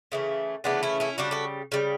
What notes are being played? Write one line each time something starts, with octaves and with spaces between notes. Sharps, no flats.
C#3 E3 A3
C#3 E3 A3 B3 D4
C#4 E4
C#4 E4
C#3 G3 D4 F#4
F#4 A4
C#3 G3